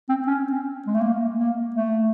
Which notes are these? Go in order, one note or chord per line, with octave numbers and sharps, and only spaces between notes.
C4
C#4
C4
G#3
A3
A#3
A#3
A3